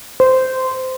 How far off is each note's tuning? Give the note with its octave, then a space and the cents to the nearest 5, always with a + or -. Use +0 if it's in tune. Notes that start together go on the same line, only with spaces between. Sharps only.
C5 -15